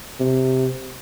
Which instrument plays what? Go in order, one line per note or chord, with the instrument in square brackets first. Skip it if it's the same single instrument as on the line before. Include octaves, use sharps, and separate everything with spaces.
[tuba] C3